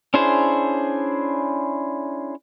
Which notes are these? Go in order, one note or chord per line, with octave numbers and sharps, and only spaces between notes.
C#4 D4 E4 G#4 C5